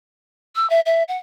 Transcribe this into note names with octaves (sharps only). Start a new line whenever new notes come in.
E6
E5
E5
F#5